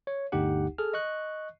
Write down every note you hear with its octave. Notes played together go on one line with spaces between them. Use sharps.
C#5
G1 D2 D#4 G4 F#5
G#4 A4 F6
D#5 C#6 F#6